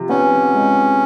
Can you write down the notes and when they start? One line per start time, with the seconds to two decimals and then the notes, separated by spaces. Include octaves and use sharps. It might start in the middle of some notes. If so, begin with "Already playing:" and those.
Already playing: C3 F3
0.09 B3 C#4
0.54 G#3